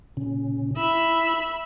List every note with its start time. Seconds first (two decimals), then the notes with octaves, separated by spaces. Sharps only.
0.17 A#2 C#3 C#4
0.77 E4 E5 B5